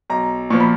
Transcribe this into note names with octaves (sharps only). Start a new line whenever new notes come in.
B1 A#5
A#2 F3 C#6
B5